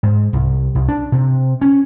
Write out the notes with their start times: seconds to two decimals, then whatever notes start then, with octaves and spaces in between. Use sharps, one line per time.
0.03 G#2
0.33 C2
0.75 C2
0.88 D4
1.12 C3
1.61 C#4